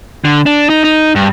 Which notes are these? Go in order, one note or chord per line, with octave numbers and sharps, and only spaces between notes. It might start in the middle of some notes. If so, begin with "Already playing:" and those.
D3
D4
D#4
D#4
G2